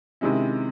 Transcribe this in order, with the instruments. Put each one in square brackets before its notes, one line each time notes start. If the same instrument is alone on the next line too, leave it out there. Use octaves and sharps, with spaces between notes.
[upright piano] C3 D#3 G#3 C#4 E4